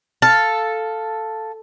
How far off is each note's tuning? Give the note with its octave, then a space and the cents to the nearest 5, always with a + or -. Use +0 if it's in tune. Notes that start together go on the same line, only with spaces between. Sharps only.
A4 +0 F5 +0